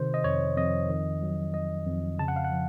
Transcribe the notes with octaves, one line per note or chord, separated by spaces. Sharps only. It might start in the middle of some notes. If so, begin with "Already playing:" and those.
Already playing: C3 D#3 C5
D#5
F2 C#5
F2 D#5
D#3
F#3
F2 D#5
F2
C#3 A5
F#5
F5
F#5
F3